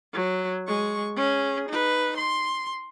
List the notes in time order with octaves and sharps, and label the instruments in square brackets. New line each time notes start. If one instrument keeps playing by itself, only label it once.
[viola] F#3
G#3 C#6
C#4 G#4
D#4 B4
C6